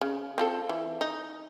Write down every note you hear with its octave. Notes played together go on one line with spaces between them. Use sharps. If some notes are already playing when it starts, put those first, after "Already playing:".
C#3
C4 F4 A4
E3
D#4